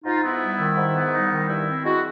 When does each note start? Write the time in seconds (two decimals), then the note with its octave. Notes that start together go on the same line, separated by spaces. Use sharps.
0.04 G#2 D#4 F4
0.23 B3 E4
0.41 G3
0.59 D#3
0.77 G#2
0.95 B3
1.13 G3 D#4
1.31 D#3
1.49 G2 E4
1.66 C4
1.85 G#3 E4 F#4